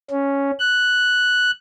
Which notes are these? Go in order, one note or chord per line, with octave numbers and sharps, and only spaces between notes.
C#4
F#6